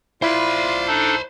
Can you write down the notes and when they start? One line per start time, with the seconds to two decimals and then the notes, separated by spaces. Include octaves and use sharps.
0.22 E4 F4 C5 D5 B5 C6
0.87 D4 D#4 A4